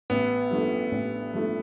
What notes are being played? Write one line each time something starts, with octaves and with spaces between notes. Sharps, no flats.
A1 B3
G2 F3 A3
A1
G2 F3 A3